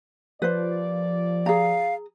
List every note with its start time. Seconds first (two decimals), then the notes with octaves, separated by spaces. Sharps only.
0.42 F3 A#3 G4 B4 C5 D5
1.46 G#4 F5 A#5